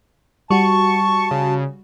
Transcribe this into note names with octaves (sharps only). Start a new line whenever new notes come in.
G3 F#4 A5 C#6
C#3